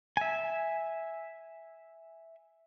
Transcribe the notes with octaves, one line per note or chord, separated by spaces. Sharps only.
E5 G#5